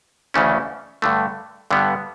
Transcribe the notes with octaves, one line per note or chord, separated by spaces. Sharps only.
D2 C#3 E3 A3 C#4
G2 D3 A3
G2 D3 G3 B3